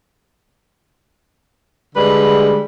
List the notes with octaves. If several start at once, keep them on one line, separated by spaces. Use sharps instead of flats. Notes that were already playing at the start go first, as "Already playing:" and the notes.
D3 G3 G#3 B4